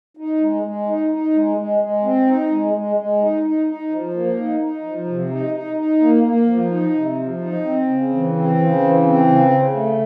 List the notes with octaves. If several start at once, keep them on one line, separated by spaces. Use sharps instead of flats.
D#4
G#3
G#3
D#4
D#4
G#3
G#3
G#3
C4
D#4
G#3
G#3
G#3
D#4
D#4
D#4
F3
A#3
D#4
D#4
F3
C3
D#4
D#4
D#4
A#3
A#3
F3
D#4
C3
F3
D#4
C4
C#3
E3
C4
C#3
E3
C4
C#3
C#3
A3